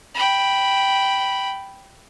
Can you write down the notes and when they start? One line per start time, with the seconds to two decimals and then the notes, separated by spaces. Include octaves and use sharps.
0.14 G5 B5